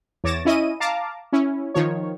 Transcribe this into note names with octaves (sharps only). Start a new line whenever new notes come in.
E2 C#5 D6 A6 A#6 E7
C#4 E4 D#5 D#7
F5 A5 A#5 D6
C#4 E4
D#3 F3 C#5